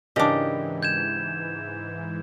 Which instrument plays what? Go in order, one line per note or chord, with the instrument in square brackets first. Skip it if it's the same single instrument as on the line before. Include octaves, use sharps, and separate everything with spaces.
[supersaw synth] G#2 E3 [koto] C#3 D4 [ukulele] G4 A#4 D#5
[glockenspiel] G6 G#6 E7